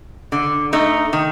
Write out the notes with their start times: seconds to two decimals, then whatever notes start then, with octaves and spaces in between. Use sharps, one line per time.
0.32 D3
0.73 A3 D#4
1.13 D#3